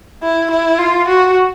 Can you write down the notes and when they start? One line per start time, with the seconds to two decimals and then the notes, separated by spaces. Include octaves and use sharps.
0.23 E4
0.51 E4
0.79 F4
1.08 F#4